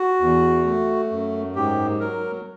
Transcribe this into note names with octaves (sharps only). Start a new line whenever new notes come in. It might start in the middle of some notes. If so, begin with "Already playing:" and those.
Already playing: F#4
E2
A3
F#2
G#2 G4
F#3 A#4